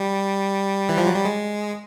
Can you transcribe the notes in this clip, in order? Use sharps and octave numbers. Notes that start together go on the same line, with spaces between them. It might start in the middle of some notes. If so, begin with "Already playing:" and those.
Already playing: G3
E3
F3
F#3
G3
G#3